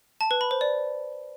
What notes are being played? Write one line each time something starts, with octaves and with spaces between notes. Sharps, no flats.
A5
B4
B5
C5
D5